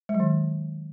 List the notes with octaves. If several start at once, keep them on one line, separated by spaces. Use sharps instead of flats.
G#3
F#3
D#3